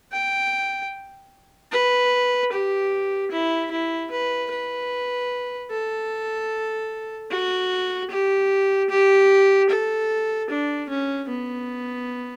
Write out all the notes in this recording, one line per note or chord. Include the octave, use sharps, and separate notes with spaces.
G5
B4
G4
E4
E4
B4
B4
A4
F#4
G4
G4
A4
D4
C#4
B3